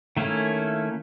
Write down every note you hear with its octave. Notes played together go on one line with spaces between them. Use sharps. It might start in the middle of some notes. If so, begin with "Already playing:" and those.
D#3 A3 A#3 C#4 E4